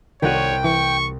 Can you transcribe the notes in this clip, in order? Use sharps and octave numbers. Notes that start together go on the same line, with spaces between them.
C2 D#3 A3 F#4 C#5 F#5 G5 D#7
E3 C#6